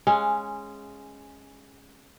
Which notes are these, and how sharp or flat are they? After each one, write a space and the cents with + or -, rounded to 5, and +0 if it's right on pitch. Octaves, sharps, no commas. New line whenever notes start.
G#3 +0 C#4 -10 F5 +10